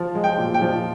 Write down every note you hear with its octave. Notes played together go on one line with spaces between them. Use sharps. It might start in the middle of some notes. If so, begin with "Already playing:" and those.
Already playing: F3
G#3
G5
A#2
G5
F3